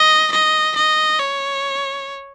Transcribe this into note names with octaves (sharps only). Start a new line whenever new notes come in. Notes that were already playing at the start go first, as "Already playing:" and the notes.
Already playing: D#5
D#5
D#5
C#5